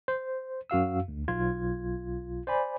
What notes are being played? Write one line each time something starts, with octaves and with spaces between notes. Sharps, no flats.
C5
F#2 F#4 F5 E6
D2
B1 F4 G#6
C5 D5 G#5 B5